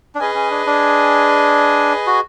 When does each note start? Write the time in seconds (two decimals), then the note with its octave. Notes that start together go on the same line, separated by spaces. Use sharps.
0.15 D4
0.19 C#4 G#4 B4 D#5 G#5
0.35 C#4
0.51 D4
0.66 D4
2.07 F#4